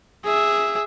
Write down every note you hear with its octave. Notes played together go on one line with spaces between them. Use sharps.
G#4 E5